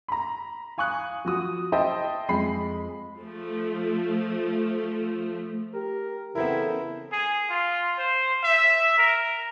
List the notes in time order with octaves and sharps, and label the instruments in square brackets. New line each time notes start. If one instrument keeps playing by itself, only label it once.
[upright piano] A#5 B5
F5 G#5 C#6 D#6 F#6
F3 F#4 D#6
C5 D#5 E5 G5 A5
F2 G#3 B5 C7
[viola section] F3 A3
[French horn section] G4 [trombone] A#4
[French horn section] C#3 E3 A4 [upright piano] B3 C4 A#4 [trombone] E4
[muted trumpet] G#4
F4
C5
E5
A#4